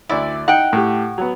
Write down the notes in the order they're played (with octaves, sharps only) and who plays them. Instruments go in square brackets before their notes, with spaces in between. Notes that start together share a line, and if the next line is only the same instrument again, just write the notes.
[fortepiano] D2 D5 E6 [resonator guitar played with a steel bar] E4
[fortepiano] D#4 [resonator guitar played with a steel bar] F#5 G5
[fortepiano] A2 G4
F#3 B3